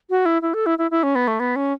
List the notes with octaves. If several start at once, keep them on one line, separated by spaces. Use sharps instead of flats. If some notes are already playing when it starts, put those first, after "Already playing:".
F#4
E4
E4
A4
E4
E4
E4
C#4
B3
A3
B3
C#4